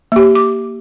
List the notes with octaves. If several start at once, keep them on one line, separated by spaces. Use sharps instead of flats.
A#3 G4
D6